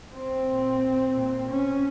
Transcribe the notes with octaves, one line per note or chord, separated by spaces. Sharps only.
C4
A#2
A#2
C#4